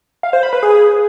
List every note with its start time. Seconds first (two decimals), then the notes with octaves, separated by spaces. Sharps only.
0.23 F5
0.33 C5
0.43 B5
0.53 B4
0.63 G#4